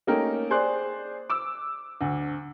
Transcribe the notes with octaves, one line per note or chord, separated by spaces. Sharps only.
A3 A#3 C#4 D#4 A#4 G5
G#4 C5 D5 C6 F#6
D6 E6
D2